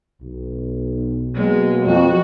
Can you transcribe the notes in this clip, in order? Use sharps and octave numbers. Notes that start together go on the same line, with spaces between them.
B1
B2 F#3 G#3 A#3
F2 F#4